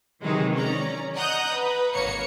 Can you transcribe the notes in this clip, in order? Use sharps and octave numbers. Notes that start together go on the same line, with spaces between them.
C3 D#3 E3 F#3 G#3 D#4
C#4 D5 A#5
D#5 F#5 A#5 D#6 F#6 G6
B4
G#1 A#3 C#5 C#7